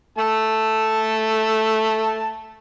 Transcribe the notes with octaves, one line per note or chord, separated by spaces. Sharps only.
A3 A5